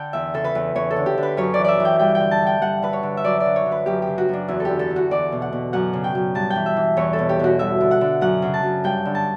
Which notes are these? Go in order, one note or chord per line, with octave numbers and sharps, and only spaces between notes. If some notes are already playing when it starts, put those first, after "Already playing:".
Already playing: D3 G5 A5
E2 E5
C#3 A4
B4
E2
E2 C#5
A4
D3
G4
D3 B4
F#2 C#5
E3 D5
D5 E5
E3
G5
G2 G5
G5
D3
A5
D3
G5
G2 F#5
D3 B4
C#5
D3
E5
F#2 D5
D5
D3
C#5
D3
B4
F#2 G4
G4
C#3
F#4
F#2 D4
E2 E4
A4
D3 G4
A4
D3
F#4
E2 D5
B2
F#5
B2
F#2 F#5
C#3
G5
F#2
G2 A5
G5
E3
E5
E3
E2 C#5
A4
B2
G4
B2 F#4
G2 E5
D3
F#5
D3
F#2 F#5
C#3
A5
F#2
G2 G5
D3
A5